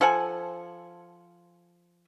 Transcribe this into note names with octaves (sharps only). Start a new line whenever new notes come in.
F3 A4 F#5 G#5